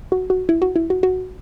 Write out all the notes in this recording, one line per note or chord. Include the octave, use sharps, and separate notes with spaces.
F#4
F#4
E4
F#4
E4
F#4
F#4